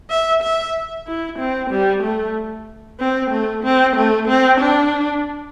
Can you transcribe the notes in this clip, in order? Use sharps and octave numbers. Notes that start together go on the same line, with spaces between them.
E5
E5
E4
C4
G3
A3
C4
A3
C4
A3
C4
D4